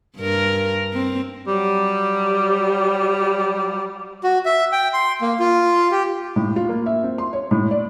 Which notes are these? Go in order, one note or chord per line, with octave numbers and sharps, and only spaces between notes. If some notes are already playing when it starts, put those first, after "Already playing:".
G2 A#4
C4
F#3 G3
F#4
E5
G5
C6
A#3
F4
G4
A2
F4
A#3
E5
C4
C6
C#5
A2
D5